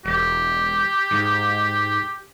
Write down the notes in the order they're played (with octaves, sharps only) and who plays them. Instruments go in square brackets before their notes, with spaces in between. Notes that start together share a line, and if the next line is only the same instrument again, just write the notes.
[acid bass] E1 [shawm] G4
[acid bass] G#2